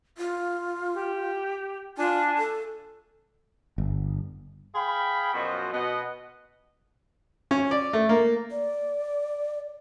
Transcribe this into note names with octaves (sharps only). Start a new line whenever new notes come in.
F4
G4
D4 F4 G#5 A5
A4
G1
G#4 F5 G5 B5
F#2 B2 F3 F#4 C5 D#5
B2 D#5 F#5
C#4
D5
A3
A#3
D5